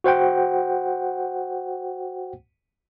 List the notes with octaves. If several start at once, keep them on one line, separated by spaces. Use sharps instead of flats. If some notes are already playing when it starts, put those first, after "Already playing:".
F#4 C5 F#5 G5